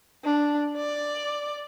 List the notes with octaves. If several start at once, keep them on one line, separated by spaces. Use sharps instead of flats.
D4
D5